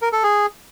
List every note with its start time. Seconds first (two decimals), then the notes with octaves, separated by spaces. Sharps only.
0.02 A#4
0.13 A4
0.23 G#4